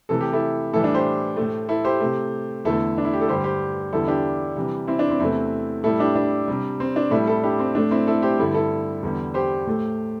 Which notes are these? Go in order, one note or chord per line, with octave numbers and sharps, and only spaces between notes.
C3 E3 A3 A4
G4
E4 A4
A2 E3 G3 E4 A4
D4
G4 C5
A2 A3
E4 A4
G4 C5
C3 A3
E2 D3 A3 E4 A4
D4
E4
G4
A4
G2 D3 G3 G4 C5
G4 C5
E2 D3 G3 E4 A4
D4 G4
C3 E3 G3
C4 E4
D4
C4 E4
E2 C3 E3 A3 C4 E4
A2 G3 E4 A4
D4 G4
D4
C3 G3
C4
D4
A2 G3 E4 A4
E4 A4
D4 G4
C4
A2 A3 D4
C4 E4
E4 A4
G4 C5
G2 D3 G3 E4 A4
E4 A4
E2 D3 G3
G4 C5
A2 A3